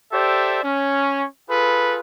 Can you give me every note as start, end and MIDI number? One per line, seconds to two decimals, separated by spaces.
0.13 0.63 67
0.13 0.63 69
0.13 0.63 72
0.13 0.63 74
0.13 0.63 76
0.64 1.26 61
1.50 1.99 65
1.50 1.99 68
1.50 1.99 69
1.50 1.99 71